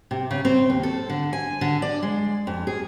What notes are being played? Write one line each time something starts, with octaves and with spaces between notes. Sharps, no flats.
C3
C#3
C4
D#2
A4
D3
G#5
D3
D5
G#3
F2
G#4